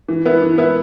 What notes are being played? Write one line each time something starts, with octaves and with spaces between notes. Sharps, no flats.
E3
B3 E4
E3
B3 E4